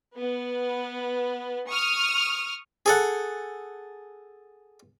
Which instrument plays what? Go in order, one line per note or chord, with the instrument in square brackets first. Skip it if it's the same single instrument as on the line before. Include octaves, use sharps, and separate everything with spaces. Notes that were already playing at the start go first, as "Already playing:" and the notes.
[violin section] B3
C#6 D#6 F6
[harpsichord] G#4 A4 F#5